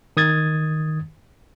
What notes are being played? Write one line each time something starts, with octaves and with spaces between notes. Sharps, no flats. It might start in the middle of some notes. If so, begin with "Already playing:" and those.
D#3 D#6 G#6 A6